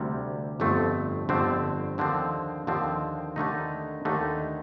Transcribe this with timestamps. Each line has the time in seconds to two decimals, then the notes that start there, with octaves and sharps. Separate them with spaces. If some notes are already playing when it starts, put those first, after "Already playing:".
Already playing: D2 C3 G3
0.60 G1 F2 D3 A3 C4
1.29 G1 F2 D3 A3 C4
1.98 D#2 D3 F3 C4
2.67 D#2 D3 F3 C4
3.36 D#2 D3 A3 D#4
4.05 D#2 D3 A3 D#4